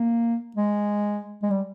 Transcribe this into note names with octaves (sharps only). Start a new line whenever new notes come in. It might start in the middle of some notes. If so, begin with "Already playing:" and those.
Already playing: A#3
G#3
G#3
G3